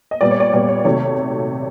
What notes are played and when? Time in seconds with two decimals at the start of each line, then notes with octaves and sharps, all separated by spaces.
0.11 D#5
0.21 A#2 G3 B3 D5
0.31 C#5
0.40 D5
0.53 A#2 G3 B3 D5
0.68 C#5
0.84 C3 D#3 F#3 A3 C#5